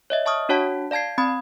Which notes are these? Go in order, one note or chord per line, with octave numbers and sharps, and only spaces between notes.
C#5 D#5 E5
E5 A5 C#6 D#6 F6
D4 F#4 C#5 F#5 A5 B6
D5 F5 A5 G#6 C7
C4 B5 D#6 G#6